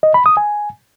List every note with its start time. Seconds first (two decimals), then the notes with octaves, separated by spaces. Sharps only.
0.03 D#5
0.14 B5
0.26 D#6
0.37 G#5